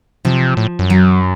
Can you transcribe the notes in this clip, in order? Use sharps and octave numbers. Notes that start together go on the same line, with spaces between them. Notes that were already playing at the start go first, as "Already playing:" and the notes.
C3 F3
A2
F#2
F#3